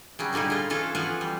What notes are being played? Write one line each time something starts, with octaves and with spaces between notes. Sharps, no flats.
C#3 F#3 G3
A#2 D3 G3 D#4 E4
G#3 F4
E3 C#4 F4 A4
E3 F3 B3 F4 F#4
G3